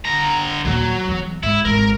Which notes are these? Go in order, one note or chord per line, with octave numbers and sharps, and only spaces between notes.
D3 A#5
D#2 A#2 F#3
E2
G#2 E4
G#1 A#4